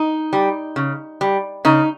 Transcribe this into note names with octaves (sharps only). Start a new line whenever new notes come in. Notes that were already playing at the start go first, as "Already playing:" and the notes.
Already playing: D#4
G3
C#3
G3
C#3 D#4